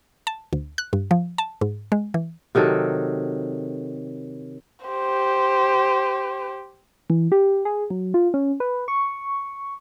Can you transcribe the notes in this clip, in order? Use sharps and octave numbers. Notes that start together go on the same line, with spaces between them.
A5
D2
F#6
G2
F3
A5
G#2
G#3
E3
C3 D#3 F#3 A4
G4 C5
E3
G4
G#4
F#3
F4
C#4
B4
C#6